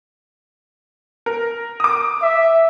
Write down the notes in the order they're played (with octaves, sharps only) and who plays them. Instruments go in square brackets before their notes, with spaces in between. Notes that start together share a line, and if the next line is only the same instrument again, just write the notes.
[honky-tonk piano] A#4
D6 D#6
[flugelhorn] E5